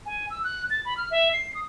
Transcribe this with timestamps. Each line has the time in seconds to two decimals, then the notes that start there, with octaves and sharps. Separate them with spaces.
0.06 G#5
0.30 E6
0.44 F#6
0.70 A6
0.85 B5
0.97 F6
1.11 E5
1.33 C7
1.55 D#6